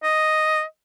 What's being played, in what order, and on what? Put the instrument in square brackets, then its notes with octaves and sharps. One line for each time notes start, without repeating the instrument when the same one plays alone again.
[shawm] D#5